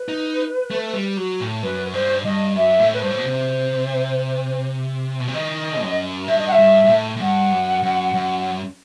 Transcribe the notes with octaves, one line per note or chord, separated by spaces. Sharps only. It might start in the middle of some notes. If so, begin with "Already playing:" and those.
Already playing: B4
D#4
A3
G3
F#3
A2
F#2 B4
G2 C5
G2 D#5
F#2 E5
A2
B4
G2 C5
A2
B2
C3
B2
C3
D#3 D#5
F#2
G2 E5
D#5
F#5
E5
G2
G2
A2
A2
G2 F#5
F#2
F#2
F#2